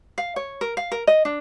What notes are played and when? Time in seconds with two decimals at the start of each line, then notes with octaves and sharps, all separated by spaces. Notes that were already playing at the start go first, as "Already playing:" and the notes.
0.18 F5
0.36 C#5
0.61 A#4
0.77 F5
0.92 A#4
1.07 D#5
1.25 D4